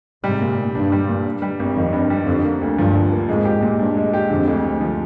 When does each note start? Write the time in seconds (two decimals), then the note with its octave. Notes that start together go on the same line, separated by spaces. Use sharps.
0.24 G#2 C3 G3
0.41 A#2
0.58 A#2
0.75 G2 D4
0.92 G3
1.09 A#2
1.26 G2
1.42 G3
1.59 G#1
1.76 F2 D#3
1.93 G2
2.10 G3
2.27 F2 D3
2.45 A#3
2.61 D2
2.78 G2 F3
2.95 D3
3.12 A#3
3.28 F2 G#2 G#3
3.45 G4
3.62 A#2
3.79 G2 D4
3.97 G#3
4.13 G4
4.30 F2 D3
4.48 D2
4.64 D2
4.81 F3